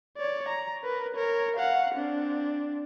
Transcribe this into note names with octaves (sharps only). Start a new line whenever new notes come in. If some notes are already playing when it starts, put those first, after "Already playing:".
C#5 D5
A#5
A#4 B4
A#4 C#5
F5 F#5
C4 D4